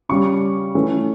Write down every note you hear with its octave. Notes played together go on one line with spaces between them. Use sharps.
C#3 G3 C#4 C#6
E3 A3 C#4